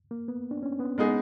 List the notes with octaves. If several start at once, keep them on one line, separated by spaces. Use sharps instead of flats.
A#3
B3
D4
C#4
B3
G#3 B3 D#4 G#4